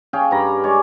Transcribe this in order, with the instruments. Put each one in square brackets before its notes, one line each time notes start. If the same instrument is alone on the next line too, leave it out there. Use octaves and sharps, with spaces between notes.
[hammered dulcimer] C#4 G#4 F5 G5
G2 A#5 B5
G#3 C#5 D5